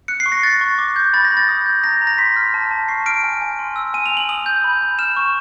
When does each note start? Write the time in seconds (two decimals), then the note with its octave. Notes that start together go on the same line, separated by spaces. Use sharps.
0.08 F#6 C#7
0.20 C7
0.26 C#6
0.32 A#6
0.43 F#6 A6
0.61 C#6
0.78 D6
0.96 G6
1.13 B5 A6
1.25 A#6
1.31 B5
1.37 A6
1.48 D#6
1.66 G6
1.84 A#5 A#6
2.01 A#5
2.07 A#6
2.18 C6 B6
2.36 F6
2.54 A5
2.71 A5
2.88 C#6 C7
3.06 F6 D7
3.24 G#5
3.41 G#5
3.59 C6
3.76 E6
3.94 G#5 D#7
4.06 F7
4.11 G#5
4.17 F#7
4.29 D#6 F#7
4.46 G6
4.64 B5
4.81 B5
4.99 F6 E7
5.17 C#6